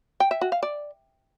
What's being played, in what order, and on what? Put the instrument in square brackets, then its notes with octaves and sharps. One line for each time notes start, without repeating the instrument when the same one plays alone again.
[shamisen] G5
E5
F#4
F5
D5